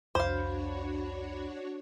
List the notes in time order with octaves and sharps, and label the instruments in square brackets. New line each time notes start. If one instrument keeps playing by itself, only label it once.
[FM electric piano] C2 F2 B5 [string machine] D4 F#4 C#5 [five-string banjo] C5 F5